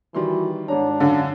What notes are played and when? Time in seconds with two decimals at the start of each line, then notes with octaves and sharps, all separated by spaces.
0.15 D#3 E3 G3 F#4 C6
0.68 G#2 D4 C#5 A#5
1.00 F#2 D3 F5